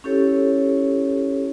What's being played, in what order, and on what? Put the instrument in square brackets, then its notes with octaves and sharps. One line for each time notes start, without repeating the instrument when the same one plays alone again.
[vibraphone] C#4 E4 G4 A4 C#5